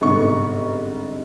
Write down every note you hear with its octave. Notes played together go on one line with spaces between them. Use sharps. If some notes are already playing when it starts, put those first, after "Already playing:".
G1 G#2 C3 B3 C#6